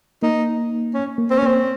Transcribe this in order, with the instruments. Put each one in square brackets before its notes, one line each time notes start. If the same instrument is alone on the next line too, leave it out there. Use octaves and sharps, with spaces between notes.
[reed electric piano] A#3 [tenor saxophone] D#4
[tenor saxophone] C#4
[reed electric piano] A#3
[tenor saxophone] C4
C#4
[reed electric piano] A#3 [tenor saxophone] C4